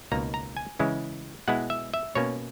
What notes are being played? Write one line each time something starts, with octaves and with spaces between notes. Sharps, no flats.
C#2 B2 A#3 D#4 A#5
A#5
G#5
C#3 E3 G#3 C#4 E4
B2 G#3 B3 E4 F#5
E5
E5
B2 A#3 C#4 C#5